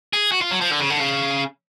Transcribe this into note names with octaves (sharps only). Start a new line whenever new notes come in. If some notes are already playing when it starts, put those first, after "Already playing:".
G#4
F#4
F4
F#3
F3
D3
C#3
D3
C#3